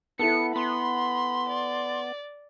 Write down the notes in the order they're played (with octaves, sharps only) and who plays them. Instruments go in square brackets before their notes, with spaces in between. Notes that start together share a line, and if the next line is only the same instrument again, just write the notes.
[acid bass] B3 [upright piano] E4 A4 [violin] C#7
[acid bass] B3 [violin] B5 [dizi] C6
[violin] D5